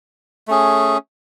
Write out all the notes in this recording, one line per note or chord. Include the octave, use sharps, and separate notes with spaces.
A3 C#4 G#4